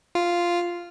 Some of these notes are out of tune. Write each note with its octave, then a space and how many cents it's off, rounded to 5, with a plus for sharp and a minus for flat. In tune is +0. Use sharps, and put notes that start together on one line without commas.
F4 -5